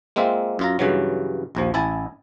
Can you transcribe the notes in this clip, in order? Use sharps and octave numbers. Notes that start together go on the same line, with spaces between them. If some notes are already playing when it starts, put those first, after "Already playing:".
G#3 A#3 C4 F4 E5
F#2 F4 A#5
G2 C#3 E3 F#3
A#1 D#2 F3
A1 E4 G#5 A5